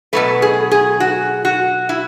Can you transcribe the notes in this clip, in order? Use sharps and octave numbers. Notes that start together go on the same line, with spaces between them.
B2 F#3 A3 B4
G#4
G#4
F#4
F#4
E4